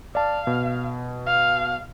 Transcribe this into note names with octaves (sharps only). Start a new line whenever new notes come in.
D5 F5 A5
B2
F5